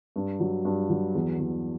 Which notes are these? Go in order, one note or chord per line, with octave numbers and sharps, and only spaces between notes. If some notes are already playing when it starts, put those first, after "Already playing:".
G2
F#3
G2
F#3
E2
E2